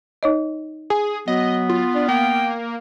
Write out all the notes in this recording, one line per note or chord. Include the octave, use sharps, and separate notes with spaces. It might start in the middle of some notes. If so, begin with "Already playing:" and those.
D#4 C#5 D#5
G#4 G#5
F#3 B3 D#5
F4
D4
A#3 G5